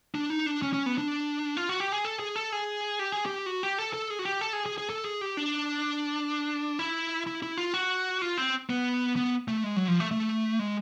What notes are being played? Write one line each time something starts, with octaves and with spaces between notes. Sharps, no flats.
D4
D#4
D4
C#4
C#4
B3
D4
F4
F#4
G4
G#4
A4
G#4
A4
G#4
G4
G#4
G4
F#4
G4
A4
A4
G#4
F#4
G4
A4
G#4
G#4
G#4
A4
G#4
G4
D4
E4
E4
E4
F4
F#4
F4
C4
B3
B3
A3
G#3
F#3
F3
A3
A3
G#3